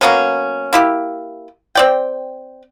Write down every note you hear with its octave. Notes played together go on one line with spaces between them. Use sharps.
F#3 A#3 B3 C#4
A#3 E4 G4
C4 D5 G5